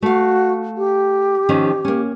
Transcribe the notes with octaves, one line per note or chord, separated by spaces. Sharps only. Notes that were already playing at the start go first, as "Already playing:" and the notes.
A3 F#4 F5
G4
D#3 F3 C#4
A#3 C#4